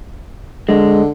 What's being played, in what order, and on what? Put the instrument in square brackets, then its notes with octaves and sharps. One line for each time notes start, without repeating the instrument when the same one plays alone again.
[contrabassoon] D3 [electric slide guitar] G#3